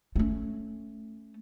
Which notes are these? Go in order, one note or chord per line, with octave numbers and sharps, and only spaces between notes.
A3 C#4